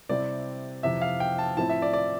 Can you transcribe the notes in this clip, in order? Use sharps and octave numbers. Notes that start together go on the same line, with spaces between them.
C3 G3 C4 E4 D5
F2 C3 E3 E5
F5
G5
A5
A2 F3 C4 E4 A5
E5
D5
D5